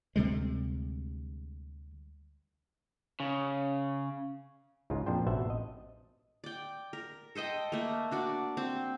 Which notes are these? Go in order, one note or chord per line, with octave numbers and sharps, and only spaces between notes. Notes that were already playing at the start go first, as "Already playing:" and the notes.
D2 C3 G3 G#3
C#3
C#2 G#2 G#3 F4
F2 A#2 F3 D4 C5 G5
A1 B2 C5 E5 F#5 A5
D#5
D5 G5
A#4
A4 C5 D#5 G5
A3 A#3
D4 F#4 D5
C4